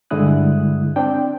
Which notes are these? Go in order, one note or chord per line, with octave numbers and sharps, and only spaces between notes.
G2 D3 G#3 E4 D#6 F#6
C4 D4 G5